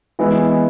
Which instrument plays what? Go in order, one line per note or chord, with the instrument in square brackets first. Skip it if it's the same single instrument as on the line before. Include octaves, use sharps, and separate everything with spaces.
[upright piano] E3 G#3 B3 E4